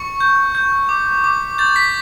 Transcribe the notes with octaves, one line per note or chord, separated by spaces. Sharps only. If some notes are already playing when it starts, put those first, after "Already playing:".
Already playing: C#6 C#7
G6
G6
D6
D6
G6 A6
B6